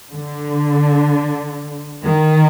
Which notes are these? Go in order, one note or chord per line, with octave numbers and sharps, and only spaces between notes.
D3
D#3